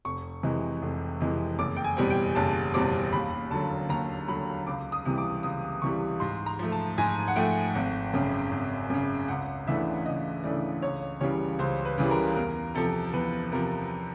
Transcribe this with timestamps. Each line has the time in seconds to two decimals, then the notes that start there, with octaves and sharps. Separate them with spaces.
0.05 F1 C#6
0.43 F2 C3 E3 G#3
0.82 F1
1.20 F2 C3 E3 G#3
1.59 F#1 D6
1.76 G5
1.84 G#5
1.97 E2 B2 G3 C4
2.10 G5
2.35 F#1 A5
2.74 E2 B2 G3 C4 D6
3.13 D#2 B5
3.51 D3 F#3 A5
3.89 D#2 A#5
4.28 D3 F#3 B5
4.67 C#2 D6
4.92 D#6
5.05 C3 E3 G3
5.18 D6
5.43 C#2 D#6
5.82 C3 E3 G3 C#6
6.20 G#2 C6
6.46 A#5
6.59 F3 A3
6.72 A5
6.98 G#2 G#5
7.28 F#5
7.36 F3 A3 G5
7.75 G#1
8.14 F#2 C#3
8.51 G#1
8.90 F#2 C#3
9.28 C#2 F#5
9.67 C#3 E3 A3 D4 E5
10.05 C#2 D#5
10.44 C#3 E3 A3 D4 D5
10.82 C#2 C#5
11.21 C#3 E3 G3 C#5
11.59 C#2 C5
11.85 B4
11.98 C#3 E3 G3
12.11 A#4
12.36 E2 A#4
12.75 C3 F3 A4
13.13 E2 B4
13.52 C3 F3 A#4